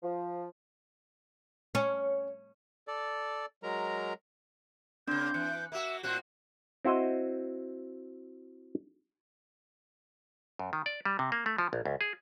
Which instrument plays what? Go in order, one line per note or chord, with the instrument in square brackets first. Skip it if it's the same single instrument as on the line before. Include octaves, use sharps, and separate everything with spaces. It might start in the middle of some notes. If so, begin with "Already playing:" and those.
[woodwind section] F3
[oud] C#4
[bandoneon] A4 D5
F#3 G#3 A#4 A#5
[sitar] C#3 A#3 [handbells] C4 D4 C6 [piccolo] G6
[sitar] E3 [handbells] F#6 C#7
[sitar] A#3 F#4 [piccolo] E5
[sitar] A2 C4 F#4 [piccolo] F#6
[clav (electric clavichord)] C4 E4 F#4 C5 D#5
F#2
D#3
D5
G3
C3
A#3
A3
F3
A#1
C#2
G#4